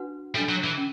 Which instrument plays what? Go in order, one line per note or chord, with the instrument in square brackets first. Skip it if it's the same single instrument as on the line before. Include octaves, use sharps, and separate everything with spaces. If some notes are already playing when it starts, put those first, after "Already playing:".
Already playing: [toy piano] D4 F#4 B4 F#5
[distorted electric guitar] G3 [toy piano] D4 A4 E5
[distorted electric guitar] F#3
E3
[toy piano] C#4